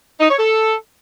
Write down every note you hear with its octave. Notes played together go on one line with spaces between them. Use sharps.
D#4
C#5
A4